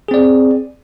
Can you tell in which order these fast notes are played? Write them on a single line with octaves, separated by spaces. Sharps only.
G#4 C4 D5